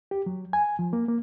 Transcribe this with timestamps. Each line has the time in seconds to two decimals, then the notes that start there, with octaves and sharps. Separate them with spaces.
0.11 G4
0.26 F#3
0.53 G#5
0.79 F3
0.93 A#3
1.08 A#3